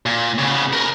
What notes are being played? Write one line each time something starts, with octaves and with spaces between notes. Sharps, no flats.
A#2
C#3 B3
A#4 B4